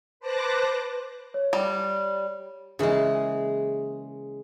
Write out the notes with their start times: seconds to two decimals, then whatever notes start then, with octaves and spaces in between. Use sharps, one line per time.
0.20 B4 C5 A5 D6 F#6 A#6
1.34 C#5
1.53 G3
2.79 C#3 E3 G#3 A#3 G#4